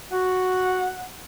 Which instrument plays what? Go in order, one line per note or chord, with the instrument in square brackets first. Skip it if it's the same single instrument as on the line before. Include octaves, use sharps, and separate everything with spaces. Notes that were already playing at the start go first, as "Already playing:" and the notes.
[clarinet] F#4 [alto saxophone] F#5